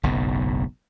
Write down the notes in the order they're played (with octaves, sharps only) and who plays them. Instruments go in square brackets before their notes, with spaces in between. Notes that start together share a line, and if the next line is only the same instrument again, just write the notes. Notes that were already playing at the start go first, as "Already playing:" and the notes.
[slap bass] F#1 B1 G#2